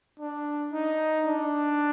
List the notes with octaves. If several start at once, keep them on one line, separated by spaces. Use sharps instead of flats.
D4
D#4
D4